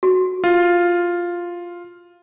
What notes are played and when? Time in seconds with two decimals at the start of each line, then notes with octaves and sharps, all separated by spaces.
0.03 F#4
0.44 F4